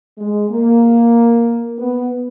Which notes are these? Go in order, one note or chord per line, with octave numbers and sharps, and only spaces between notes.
G#3
A#3
B3